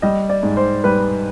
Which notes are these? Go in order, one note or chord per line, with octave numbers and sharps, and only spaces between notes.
G3 D#5
D5
G#2
C5
G3 B4